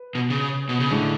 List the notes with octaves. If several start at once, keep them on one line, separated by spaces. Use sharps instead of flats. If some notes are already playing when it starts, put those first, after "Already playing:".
Already playing: B4
B2
C#3
B2
C#3
A2 D3 G#3 D4